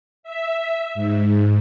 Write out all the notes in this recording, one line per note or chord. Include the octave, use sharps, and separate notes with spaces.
E5
G#2